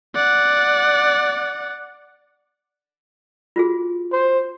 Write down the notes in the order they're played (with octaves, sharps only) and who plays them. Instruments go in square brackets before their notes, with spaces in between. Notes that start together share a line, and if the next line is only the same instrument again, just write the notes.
[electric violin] D5 F#5
[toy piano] F4 F#4 G#4
[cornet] C5